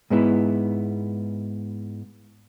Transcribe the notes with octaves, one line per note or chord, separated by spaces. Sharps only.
G#2 G#3 B3 E4